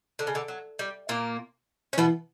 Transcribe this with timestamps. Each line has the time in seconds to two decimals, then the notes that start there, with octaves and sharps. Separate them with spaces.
0.19 D3
0.27 C#3
0.35 D3
0.48 F#3
0.79 G3
1.09 A#2 A#3
1.93 C#4
1.98 B2 E3 B3